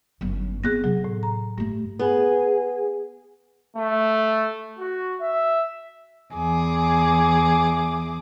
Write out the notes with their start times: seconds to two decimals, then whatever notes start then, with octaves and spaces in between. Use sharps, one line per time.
0.21 G1 F#2
0.64 B3 C4 G#4 F#6 A#6
0.84 C3 F#3
1.04 A2
1.23 A#5
1.58 G2 F#3 A3
1.99 B3 G#4
3.76 A3
4.79 F#4
5.20 E5
6.33 E2 G#4 D6